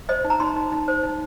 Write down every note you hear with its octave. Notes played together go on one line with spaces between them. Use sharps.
C5 D#5
D#4
A#5
D#4 C6
D#4
D#4
C5
D#4